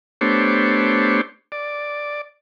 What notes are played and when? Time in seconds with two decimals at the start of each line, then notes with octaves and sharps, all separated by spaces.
0.21 A3 B3 D4 G4 C5 C#5
1.52 D5